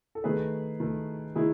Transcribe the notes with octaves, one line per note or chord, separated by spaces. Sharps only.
A4
D#3 A3 G#4 B4
D#3 A3
D#3 E4 G#4